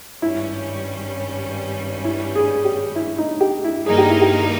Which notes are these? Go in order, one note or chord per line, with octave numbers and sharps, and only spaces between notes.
G#1 G2 G3 C#4 E4
E4
G#4
G4
E4
D#4
G4
E4
G2 D#3 A#3 D#4 G#4
G4
E4
G4